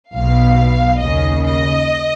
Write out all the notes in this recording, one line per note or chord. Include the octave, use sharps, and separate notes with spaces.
B1 B2 F5
D#2 C#3 D#5
D#5